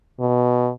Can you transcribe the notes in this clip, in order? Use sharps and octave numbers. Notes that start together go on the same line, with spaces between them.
B2